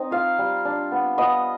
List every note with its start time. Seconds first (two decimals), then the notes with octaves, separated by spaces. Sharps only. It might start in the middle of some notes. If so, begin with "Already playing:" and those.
Already playing: C4 D#4 D#5
0.11 F4 F5
0.39 G3
0.65 D4
0.92 B3
1.17 B3 D#5